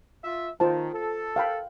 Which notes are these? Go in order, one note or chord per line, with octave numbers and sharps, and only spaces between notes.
F4 E5
D#3 F4 C5 A5
A4
F5 G5 B5